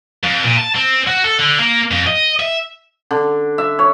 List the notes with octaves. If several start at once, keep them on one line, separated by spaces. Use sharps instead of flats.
F2
A#2
A5
C4
F#4
A4
D3
A#3
F2
D#5
E5
D3
E5
C#5